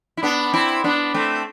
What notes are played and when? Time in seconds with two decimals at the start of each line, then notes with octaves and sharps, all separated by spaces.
0.17 E4
0.23 B3 D4
0.53 C4 E4
0.84 B3 D4
1.14 A3 C4